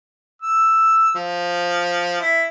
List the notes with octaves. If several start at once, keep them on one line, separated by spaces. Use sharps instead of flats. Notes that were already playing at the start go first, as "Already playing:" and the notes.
E6
F3
E4